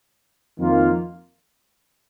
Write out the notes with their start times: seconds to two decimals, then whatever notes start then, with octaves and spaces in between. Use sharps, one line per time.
0.57 F2 D#3 A#3 F4